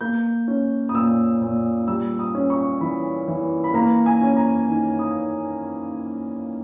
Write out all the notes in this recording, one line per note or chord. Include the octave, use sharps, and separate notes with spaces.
A#3 G6
C#4
D#6
A#2 E6
A#2
G3 E6
D#6
C#4
C#6
E3 B5
E3
B5
A#3 A#5
G#5
C#4
A#5
D#3
D#6